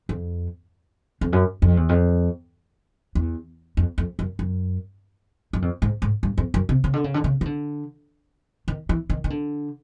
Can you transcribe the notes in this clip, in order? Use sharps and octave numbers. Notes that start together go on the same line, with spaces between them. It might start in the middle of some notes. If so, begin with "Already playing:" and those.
F2
F2
F#2
F2
E2
F2
E2
F2
F2
F#2
F#2
F#2
F2
G#2
G#2
G2
F2
F#2
C3
C#3
D3
C#3
D3
C#3
D#3
D3
D#3
E3
D#3
D#3
D3